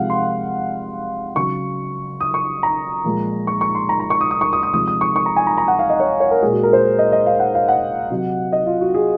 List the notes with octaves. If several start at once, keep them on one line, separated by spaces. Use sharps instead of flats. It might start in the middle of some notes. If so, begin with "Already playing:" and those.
Already playing: C3 F3 G#3 F5 F#5
C6
C#3 F#3 C#6
D#6
C#6
A#5
A#2 F3 G#3
C#6
C#6
C6
A#5
A#5
C#6
D#6
D#6
C#6
D#6
D#6
C3 F3 G#3 D#6
D#6
C#6
C#6
A#5
G#5
A#5
A#5
F#5
F5
D#5
C#5
C#5
A#4
A#2 G#3 G#4
F#4
A#4
C5
D#5
D#5
F5
F#5
F5
F#5
C3 F#3
D#5
F4
F#4
G#4